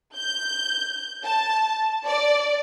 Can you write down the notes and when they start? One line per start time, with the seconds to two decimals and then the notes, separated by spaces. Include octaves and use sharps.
0.15 G6
1.23 A5
2.05 D5